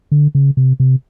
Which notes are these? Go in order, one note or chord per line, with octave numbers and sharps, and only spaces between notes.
D3
C#3
C3
C3